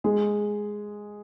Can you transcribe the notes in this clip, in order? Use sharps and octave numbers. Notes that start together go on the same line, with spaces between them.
G#3 G#4